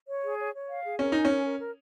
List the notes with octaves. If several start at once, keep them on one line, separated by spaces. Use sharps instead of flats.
C#5
G#4
C#5
C#5
F5
G#4
C#4 A#4
D#4 G#5
C#4 A#4
A#4
A#4